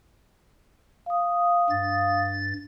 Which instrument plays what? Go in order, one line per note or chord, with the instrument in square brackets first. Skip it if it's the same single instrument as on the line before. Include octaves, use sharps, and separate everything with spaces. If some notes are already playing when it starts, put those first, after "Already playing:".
[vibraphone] F5 D#6
[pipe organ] G2 A6